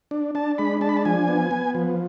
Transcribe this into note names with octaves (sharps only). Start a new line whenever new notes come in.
D4
D4 A5
G#3 B5
D4 A5
B5
A5
F3 G#5
B3
B3
F3